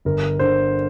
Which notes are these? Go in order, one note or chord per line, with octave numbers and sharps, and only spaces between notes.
G1 A#4
D3 C5